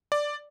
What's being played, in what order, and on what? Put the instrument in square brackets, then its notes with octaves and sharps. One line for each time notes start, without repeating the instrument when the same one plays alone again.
[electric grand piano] D5